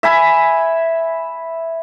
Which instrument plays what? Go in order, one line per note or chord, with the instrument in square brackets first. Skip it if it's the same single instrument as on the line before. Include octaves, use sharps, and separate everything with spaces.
[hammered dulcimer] E5 G#5 B5